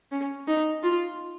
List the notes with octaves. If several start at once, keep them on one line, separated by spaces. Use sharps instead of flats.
C#4
D#4
F4